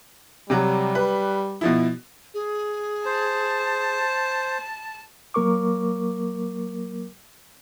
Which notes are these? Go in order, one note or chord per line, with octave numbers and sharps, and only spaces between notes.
C3 F#3 G3
B4
B2 F3 E4
G#4
C5 A5
F#3 A#3 A#4 C#6 D6